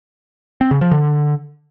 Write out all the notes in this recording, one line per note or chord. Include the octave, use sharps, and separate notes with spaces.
C4
C#3
F3
D3